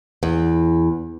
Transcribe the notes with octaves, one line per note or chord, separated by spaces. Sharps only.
E2